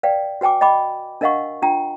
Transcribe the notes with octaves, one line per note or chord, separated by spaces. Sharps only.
B4 D5 F5 G5
F#4 B4 G5 G#5 D6
D#5 G5 B5 D6
D4 A#4 D#5 F5 F#5 C#6
D4 F4 G5 A#5